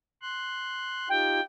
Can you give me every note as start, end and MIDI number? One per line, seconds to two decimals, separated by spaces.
0.22 1.08 84
0.22 1.08 90
1.09 1.41 63
1.09 1.41 65
1.09 1.41 67
1.09 1.41 79